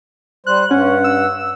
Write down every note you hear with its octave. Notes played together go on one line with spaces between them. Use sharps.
G3 C5 F#6
G2 C#4 F#5
E6